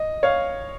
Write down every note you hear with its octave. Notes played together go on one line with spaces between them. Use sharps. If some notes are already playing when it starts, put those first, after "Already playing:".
Already playing: D#5
C#5 F5